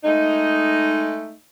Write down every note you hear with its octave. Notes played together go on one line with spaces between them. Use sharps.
G#3 A3 D#4